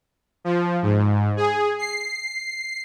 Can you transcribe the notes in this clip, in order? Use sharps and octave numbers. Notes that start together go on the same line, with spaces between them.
F3
G#2
G#4
C7